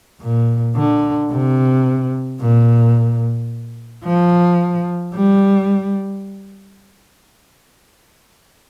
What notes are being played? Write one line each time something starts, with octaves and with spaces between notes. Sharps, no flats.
A#2
D3
C3
A#2
F3
G3